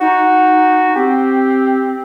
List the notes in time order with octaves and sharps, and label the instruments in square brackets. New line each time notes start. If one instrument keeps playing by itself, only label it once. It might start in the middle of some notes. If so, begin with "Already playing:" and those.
[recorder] D#4 [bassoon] F#4
[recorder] C4 [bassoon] G4